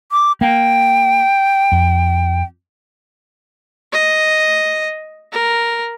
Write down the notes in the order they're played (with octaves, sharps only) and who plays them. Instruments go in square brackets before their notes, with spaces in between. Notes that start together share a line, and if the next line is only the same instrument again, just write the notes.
[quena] D6
[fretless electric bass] A#3 [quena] G5
[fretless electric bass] F2
[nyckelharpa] D#5
A#4